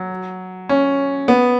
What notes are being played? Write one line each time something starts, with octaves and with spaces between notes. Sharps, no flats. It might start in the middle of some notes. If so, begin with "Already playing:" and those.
Already playing: F#3
C#4
B3